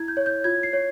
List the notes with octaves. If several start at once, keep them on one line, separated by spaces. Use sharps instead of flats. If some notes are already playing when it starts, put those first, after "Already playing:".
Already playing: E4 G#6
G6
C#5
G6
F4 G#6
C7
C#5